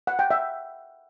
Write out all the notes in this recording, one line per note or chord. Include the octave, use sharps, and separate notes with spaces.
F#5
G5
E5